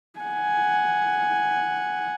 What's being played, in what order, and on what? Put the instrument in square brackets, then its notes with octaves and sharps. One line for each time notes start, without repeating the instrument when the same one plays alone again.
[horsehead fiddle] F#5 G#5